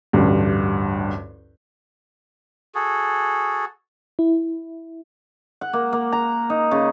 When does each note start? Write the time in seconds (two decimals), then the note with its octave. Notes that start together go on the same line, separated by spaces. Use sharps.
0.13 A1 D2 G2
2.75 F#4 G#4 A4
4.19 E4
5.61 F#5
5.73 A#3
5.93 A#3
6.12 A#5
6.50 D#4
6.71 C#3